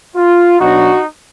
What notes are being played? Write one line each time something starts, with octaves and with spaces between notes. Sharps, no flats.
F4
B2 F#3 D4 D#4 F#4